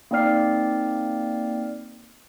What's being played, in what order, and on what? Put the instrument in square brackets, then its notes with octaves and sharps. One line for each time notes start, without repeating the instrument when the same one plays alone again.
[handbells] A#3 C4 D#4 D5 F6 C7